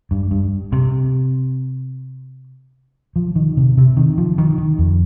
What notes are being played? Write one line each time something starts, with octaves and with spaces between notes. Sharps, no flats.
G2
G2
C3
F3
D#3
C3
C3
D#3
F3
D#3
D#3
F2